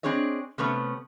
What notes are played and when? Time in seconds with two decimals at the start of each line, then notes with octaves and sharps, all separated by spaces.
0.03 C4 D4 G#4 C#5 D#5
0.58 C3 A3 B3 C#4